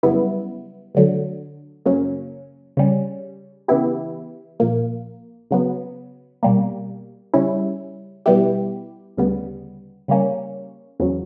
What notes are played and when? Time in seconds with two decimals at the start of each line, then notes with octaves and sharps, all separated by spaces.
0.03 F#2 C#3 G3 B3 E4
0.95 D2 D3 F#3
1.86 F#2 C#3 F#3 A#3 C#4
2.77 C#3 G3 C#4
3.68 C#3 E3 B3 E4 G4
4.60 A#1 A#2 A#3
5.51 C#3 F#3 B3
6.43 B2 G3 A#3
7.34 C#3 G3 C#4 E4
8.26 B2 G3 B3 E4 G4
9.17 D2 C#3 G3 B3
10.08 C#3 G3 A#3 C#4
11.00 E2 C#3 F#3